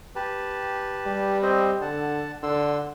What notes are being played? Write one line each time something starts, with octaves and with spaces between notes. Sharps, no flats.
G4 B4 A5
G3
C4 C5 D#5
D3 F#5 A5
D3 F#5 C6 E6